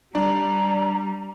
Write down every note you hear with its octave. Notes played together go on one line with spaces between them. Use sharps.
G3 D4 A#5